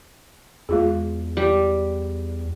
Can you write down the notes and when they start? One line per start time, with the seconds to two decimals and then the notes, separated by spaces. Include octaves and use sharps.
0.69 E2 G#3 F4 G#4
1.37 G3